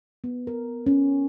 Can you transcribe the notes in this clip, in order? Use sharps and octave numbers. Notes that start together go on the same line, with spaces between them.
B3
A#4
C#4